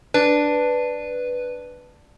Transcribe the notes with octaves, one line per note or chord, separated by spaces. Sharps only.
D4 B4